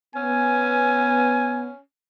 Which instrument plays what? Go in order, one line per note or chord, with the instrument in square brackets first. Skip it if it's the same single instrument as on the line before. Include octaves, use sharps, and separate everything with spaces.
[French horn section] B3 [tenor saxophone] C#4 [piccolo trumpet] G#5